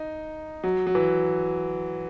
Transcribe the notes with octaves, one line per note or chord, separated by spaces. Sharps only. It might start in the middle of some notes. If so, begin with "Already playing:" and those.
Already playing: D#4
F#3
F#3
E3